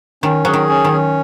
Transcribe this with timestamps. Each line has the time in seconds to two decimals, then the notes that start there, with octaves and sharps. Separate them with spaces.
0.23 D#3 C#4
0.45 F#3 G#4
0.54 D#3
0.69 C#4
0.84 D#3
0.92 C#4